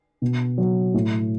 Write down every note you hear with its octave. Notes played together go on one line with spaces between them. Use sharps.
B2
F#3
A2